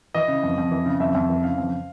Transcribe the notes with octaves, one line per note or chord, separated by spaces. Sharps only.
E3 D#5
C#3
F2
F2
E3
C#3
F2 E5
F2
E3
C#3 F5
F2